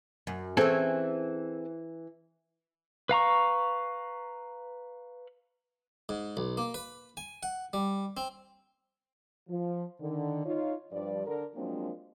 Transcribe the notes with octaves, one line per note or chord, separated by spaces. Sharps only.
F#2
E3 C4 C#4 G#4 A4
B4 F5 A#5 C#6
G#2
B1
A#3
B4
G#5
F#5
G3
C4
F3
D3 D#3
D#4 F4 C#5
G2 F3 D5
D3 A#4
F3 F#3 G#3 A#3 C4 D4